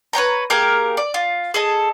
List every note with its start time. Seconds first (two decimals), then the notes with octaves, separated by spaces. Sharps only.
0.13 B4 C#5 G5 A#5
0.50 A#3 G4 G#4 A#4
0.97 D5
1.14 F4
1.54 G#4 A4 D#5